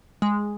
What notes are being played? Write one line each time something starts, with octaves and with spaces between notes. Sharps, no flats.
G#3